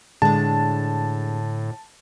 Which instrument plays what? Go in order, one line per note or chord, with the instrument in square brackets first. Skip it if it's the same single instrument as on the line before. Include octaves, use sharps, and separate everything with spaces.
[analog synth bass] A2 [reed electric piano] D3 [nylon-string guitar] G#3 D4 [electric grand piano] A5